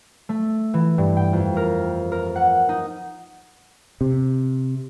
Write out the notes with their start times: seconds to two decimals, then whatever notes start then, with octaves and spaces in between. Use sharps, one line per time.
0.29 A3
0.74 E3
0.98 G2
1.17 G5
1.33 F2
1.57 A#4
2.12 A#4
2.36 F#5
2.69 D#4
4.01 C3